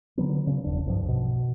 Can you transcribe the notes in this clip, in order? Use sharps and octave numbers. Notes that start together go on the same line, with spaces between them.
D3 F#3 B3
C#3
F1 E2 D4
B1 G2 F3
B2